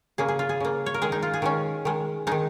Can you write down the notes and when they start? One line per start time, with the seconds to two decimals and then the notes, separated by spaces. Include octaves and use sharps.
0.18 C#3 A#3 G#4
0.28 G#4
0.39 F4
0.49 G#4
0.60 C#3 A#3
0.86 C#5
0.94 A#4
1.02 D#3 G#3 G#4
1.12 D#4
1.22 F4
1.34 G#4
1.42 D#3 G#3 C#4
1.85 D#3 G#3
2.27 D#3 G#3 D#4